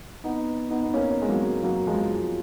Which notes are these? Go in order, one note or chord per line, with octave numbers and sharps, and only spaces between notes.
B3 D#4
B3 D#4
B3
A#3 C#4
G#3
F#3 A#3
F#3 A#3
F3 G#3